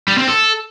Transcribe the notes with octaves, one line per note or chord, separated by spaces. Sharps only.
G3
C4
A4